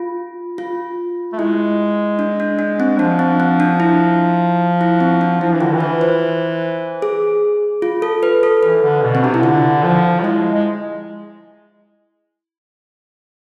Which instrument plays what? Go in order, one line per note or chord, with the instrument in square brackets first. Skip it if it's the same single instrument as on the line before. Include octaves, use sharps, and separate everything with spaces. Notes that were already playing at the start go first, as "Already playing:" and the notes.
Already playing: [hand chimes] F4
F4
[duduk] A3
[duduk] G#3 [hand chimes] E4
[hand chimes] D4
D4
D4
C4
[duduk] F3 [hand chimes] D4
[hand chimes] C4
C4
D4
E4
E4
C4
D4
[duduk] F3 [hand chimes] E4
[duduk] E3
[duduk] D3 [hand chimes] F4
[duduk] E3
[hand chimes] B4
C5
G#4
F4
A4
B4
A4
[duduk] E3 [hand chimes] B4
[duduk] D3
B2
[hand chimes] C4
[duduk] C3 [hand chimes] D4
[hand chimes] E4
[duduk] D3 [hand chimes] F4
[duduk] F3
[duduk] G#3 [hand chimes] E4
[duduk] G#3